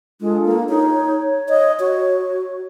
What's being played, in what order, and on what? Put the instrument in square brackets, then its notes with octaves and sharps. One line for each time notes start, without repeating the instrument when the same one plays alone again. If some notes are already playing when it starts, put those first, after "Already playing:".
[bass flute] G#3 [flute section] D4 F4 A4
[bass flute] A#3
[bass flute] D#4 [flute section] G#4 A#4 C#5
[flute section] C#5
[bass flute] D#5
F#4